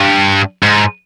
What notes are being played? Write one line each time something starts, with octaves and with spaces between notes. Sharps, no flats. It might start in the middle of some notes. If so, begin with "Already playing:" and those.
Already playing: G2
G#2